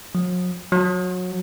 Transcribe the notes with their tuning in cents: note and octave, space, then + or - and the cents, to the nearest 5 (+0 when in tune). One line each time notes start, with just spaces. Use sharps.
F#3 -45
F#3 -25